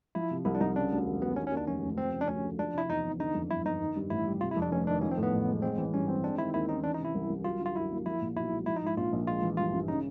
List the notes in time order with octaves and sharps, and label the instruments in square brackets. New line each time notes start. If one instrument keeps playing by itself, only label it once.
[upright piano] F3 [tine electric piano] E4
[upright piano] C3
[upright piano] C2 [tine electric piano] E4
[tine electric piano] D4
[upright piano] C2 [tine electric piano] D#4
[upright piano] C#3 [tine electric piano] D4
[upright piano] D2
E1
[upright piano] F#3 [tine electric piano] B3
[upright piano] D#3 [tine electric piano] C#4
[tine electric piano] C#4
[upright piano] D#2
[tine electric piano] D4
[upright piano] F1 [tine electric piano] C#4
[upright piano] F1
[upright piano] F3 [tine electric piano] C4
[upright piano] C#3
[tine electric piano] D4
[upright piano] D2 [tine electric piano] C#4
[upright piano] A3
[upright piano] F3 [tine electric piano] D4
[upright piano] C3 [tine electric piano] E4
[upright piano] E2 [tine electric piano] D#4
[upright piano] E2
[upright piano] D3 [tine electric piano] D#4
[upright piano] F2
[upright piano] G1 [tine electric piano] E4
[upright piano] G1 [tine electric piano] D#4
[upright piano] D#3
G2
[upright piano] A1 [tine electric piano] E4
[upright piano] G3
[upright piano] C3 [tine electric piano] F4
[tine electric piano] E4
[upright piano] F2
[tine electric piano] D4
[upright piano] F1 [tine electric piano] C#4
[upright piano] D#3 [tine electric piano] D4
[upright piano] F3 [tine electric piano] C#4
[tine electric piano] C4
[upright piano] A2
[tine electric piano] B3
[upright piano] A1
G#3
[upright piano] G#3 [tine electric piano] C4
[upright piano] E3
[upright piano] G2 [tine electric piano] C#4
[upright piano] C4
[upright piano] G#3 [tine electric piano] D4
[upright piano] D#3 [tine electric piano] E4
[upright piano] D#2 [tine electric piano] E4
[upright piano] C#4 [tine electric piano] D#4
[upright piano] E3 [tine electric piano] D4
[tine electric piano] D#4
[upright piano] C3 [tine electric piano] E4
[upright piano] C2
C2
[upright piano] F#3 [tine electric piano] F4
[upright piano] D3
[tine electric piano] F4
[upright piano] F#2 [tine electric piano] E4
[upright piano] A#3
[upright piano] F3 [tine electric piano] E4
[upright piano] A#2
[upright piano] B1 [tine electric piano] E4
[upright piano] G#3
[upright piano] F3 [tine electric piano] E4
[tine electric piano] D#4
[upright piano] G#2 [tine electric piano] E4
[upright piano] A#1 [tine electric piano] F4
[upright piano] A#1
[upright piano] G#3 [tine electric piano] F4
[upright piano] E3
[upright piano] G2 [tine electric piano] F4
[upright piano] G2
[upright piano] C#3 [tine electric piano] D#4